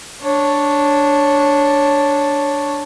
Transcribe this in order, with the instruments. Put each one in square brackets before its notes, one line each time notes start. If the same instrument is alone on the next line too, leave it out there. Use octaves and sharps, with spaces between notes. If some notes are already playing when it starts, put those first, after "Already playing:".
[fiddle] D4 C#5